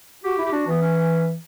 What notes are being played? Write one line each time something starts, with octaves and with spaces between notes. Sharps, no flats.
F#4 G4
E4
G4
D4 F#4
E3 B3
C#4